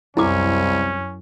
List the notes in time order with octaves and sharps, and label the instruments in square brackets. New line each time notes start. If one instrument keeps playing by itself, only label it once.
[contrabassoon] C2 [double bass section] F#2 [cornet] C#4 [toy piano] E4 D6